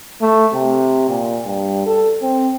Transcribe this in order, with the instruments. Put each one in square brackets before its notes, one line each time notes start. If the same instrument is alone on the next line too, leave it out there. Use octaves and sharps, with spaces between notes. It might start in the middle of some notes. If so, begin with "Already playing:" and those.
[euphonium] A3
C3
A#2
G2
A4
C4